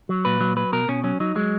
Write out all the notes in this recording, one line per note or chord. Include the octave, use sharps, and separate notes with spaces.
F#3
A#2 B4
F#3
F#3 B4
B2 A#4
B2 C#4
F#3 C#4
F#3 D#4
F#3 G#3